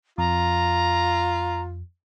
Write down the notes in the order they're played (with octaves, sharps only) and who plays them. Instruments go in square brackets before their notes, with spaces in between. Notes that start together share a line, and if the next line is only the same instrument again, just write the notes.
[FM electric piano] F2 [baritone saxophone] F4 [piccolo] A#5